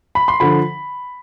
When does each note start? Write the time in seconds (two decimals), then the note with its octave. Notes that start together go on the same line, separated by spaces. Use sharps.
0.15 B5
0.28 C6
0.40 D3 F3 B5